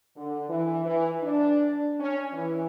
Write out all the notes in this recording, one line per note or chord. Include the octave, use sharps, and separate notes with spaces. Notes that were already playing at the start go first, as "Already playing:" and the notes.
D3
E3
E3
D4
C#4
E3